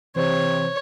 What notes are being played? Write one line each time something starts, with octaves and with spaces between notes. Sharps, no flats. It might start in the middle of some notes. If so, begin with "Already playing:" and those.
C3 E3 C5 C#5